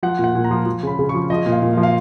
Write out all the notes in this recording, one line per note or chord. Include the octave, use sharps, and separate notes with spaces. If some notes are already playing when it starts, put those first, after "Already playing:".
F3 F#5
A#2
F#5
A#2
A#5
F3
F3
C#3 B5
C#3
C#6
F3
F3 D#5
A#2
F5
A#2
F5
F3
F5